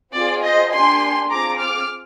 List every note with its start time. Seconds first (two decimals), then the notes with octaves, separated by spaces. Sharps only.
0.13 C4 F4 G#4 D5
0.42 C5 D#5
0.71 A#3 D4 G4 G#5 C6
1.30 C4 F4 G#4 A#5 D6
1.58 D6 F6